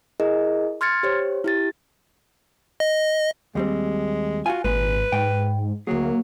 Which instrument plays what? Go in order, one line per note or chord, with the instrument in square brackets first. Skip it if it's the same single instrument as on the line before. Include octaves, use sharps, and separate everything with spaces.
[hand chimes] E4 G#4 A#4 D#5
C6 F6 G#6 A6 C#7
G4 C5 C#5
E4 G4 A6
[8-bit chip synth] D#5
[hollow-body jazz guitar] D#2 G3 C4 [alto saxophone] G#3
[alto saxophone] F4 [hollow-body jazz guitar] F#4 G#5
[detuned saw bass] G#1 [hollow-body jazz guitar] A#2 G#3 [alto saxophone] B4
[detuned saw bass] G#2 [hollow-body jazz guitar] G5
[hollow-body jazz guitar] D2 G#4 [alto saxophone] F#3 [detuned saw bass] A#3